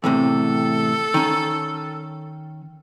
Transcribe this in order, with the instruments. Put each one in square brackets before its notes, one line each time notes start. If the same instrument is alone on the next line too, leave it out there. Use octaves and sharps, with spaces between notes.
[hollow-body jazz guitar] E2 A2 C3 [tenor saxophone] A4
[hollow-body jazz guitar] D#3 C#4